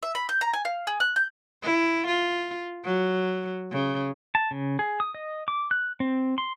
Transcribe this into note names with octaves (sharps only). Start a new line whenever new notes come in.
E5
B5
G6
A#5
G#5
F5
G#4
F#6
G6
E4
F4
F#3
C#3
A5
C#3
G#4
D#6
D#5
D6
F#6
C4
C6